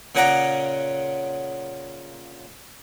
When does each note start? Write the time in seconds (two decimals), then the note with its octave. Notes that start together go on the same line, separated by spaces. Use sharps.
0.15 A#2 C#3 C#4 F#5 A#5 D6